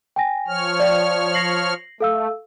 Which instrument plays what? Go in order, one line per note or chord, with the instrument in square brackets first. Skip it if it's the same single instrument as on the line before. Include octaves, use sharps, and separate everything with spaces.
[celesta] G5 G#5 A#6
[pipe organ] F3 C#5 F6
[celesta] D5 F5 G5
A#6 C7 F#7
[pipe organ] A3 [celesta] A4 F5 E6